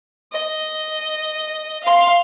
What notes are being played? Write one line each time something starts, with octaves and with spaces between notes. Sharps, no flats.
D#5
F5 C6